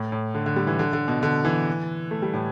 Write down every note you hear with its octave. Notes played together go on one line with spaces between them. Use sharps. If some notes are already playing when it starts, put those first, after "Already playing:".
Already playing: A2
A2
D3
D3
G3
E3
D3
D3
B2
D3
E3
A3
G3
A2